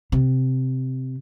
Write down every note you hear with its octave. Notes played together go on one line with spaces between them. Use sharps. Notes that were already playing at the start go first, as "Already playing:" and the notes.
C3